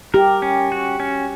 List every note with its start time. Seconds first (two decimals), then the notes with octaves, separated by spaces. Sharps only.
0.14 G4 A#4
0.42 C#4
0.72 F#4
1.00 C#4